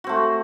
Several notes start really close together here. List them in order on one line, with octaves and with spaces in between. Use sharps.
F#4 C4 A3